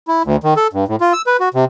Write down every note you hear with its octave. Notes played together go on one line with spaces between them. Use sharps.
E4
D2
D#3
A4
G2
A2
F4
E6
B4
F#4
C3